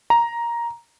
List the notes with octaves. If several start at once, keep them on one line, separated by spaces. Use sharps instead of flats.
A#5